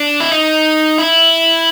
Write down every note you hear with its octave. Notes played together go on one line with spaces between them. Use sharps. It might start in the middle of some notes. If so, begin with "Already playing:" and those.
Already playing: D4
E4
D#4
E4